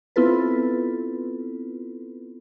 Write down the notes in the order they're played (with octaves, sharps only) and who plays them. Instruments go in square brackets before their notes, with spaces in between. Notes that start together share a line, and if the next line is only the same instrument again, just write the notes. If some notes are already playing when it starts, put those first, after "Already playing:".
[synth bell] B3 C4 E4 F4 A4 B4